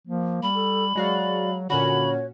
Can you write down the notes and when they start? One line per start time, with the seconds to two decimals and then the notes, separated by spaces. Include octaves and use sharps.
0.07 F3 A#3
0.43 G3 B5
0.54 A4
0.95 F#3 G#3 F#4 D5 F5
1.70 A#2 D3 C#4 F#4 C#5 B5